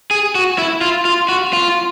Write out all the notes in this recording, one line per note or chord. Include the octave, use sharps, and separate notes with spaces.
G#4
F#4
E4
F4
F4
F#4
F4